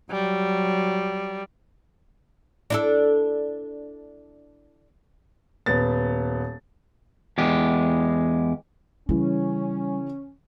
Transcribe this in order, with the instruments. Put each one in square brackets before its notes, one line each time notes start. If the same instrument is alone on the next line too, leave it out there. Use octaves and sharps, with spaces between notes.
[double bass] F#3 [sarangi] G3
[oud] D4 E4 A4
[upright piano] D#1 B3 A6
[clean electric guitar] E2 G#3 G4
[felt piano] C#3 E3 [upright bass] G3 [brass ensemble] C#4